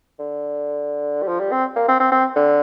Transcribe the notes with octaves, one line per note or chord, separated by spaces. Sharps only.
D3
G3
F3
G3
C4
A#3
C4
C4
C4
D3